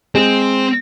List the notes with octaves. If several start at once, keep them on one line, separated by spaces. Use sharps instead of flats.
G#3 C4